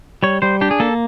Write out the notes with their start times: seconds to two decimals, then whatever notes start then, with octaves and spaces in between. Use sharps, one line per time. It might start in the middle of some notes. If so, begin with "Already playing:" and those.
0.23 G3 C#5
0.42 G3 C5
0.61 D4 G4
0.71 G#4
0.80 A#3 A4